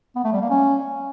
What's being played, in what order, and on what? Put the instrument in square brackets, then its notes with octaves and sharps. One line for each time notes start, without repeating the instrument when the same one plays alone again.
[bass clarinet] B3
A3
G3
A#3
C#4